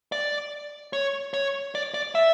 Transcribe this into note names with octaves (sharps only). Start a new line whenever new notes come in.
D5
C#5
C#5
D5
D5
E5